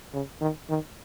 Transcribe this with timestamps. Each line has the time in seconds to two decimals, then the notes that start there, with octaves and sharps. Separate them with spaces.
0.13 C#3
0.41 D#3
0.70 D#3